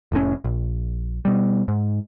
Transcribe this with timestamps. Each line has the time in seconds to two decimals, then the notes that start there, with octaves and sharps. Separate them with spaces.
0.12 F1 A2 C3 C#4
0.44 A#1
1.25 B2 G3
1.68 G#2